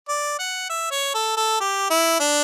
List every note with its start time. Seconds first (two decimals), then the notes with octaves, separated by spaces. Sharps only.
0.08 D5
0.39 F#5
0.70 E5
0.91 C#5
1.15 A4
1.37 A4
1.60 G4
1.90 E4
2.20 D4